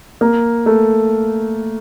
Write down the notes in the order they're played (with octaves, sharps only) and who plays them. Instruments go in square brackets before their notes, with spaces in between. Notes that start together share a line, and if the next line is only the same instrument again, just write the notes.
[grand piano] A#3
A3